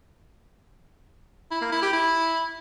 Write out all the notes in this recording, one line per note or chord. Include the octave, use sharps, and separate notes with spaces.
E4
A#3
E4
G4
E4